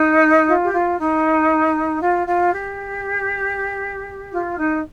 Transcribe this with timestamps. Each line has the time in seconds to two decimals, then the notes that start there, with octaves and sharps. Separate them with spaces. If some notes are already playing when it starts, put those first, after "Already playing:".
Already playing: D#4
0.47 F4
0.63 G4
0.73 F4
0.98 D#4
2.01 F4
2.26 F4
2.52 G4
4.32 F4
4.58 D#4